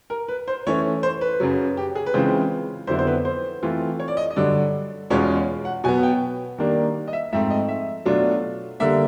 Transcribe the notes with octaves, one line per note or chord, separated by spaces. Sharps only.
A#4
B4
C5
E3 A3 C#4 C#5
C5
B4
F#2 C#3 F#3
G4
G#4
B4
C#3 E3 G#3 C4 F4 C5
F2 D3 F#3 B3 E4 C5
C5
B4
C5
E3 A3 C4 F4
C#5
D5
D#5
D#5
G2 D3 F#3 D5
E2 B2 G#3 C#4 F4 C#5
F#5
B2 F#3 B3 G#5
G5
D#3 G3 A#3 D4
D#5
E5
G#2 F3 A3 C4 E5
D#5
E5
B2 F#3 A3 D4 F4
D3 G3 A#3 E5